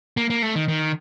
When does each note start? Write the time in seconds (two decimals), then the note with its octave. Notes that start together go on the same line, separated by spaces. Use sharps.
0.17 A#3
0.30 A#3
0.42 A3
0.56 D#3
0.68 D#3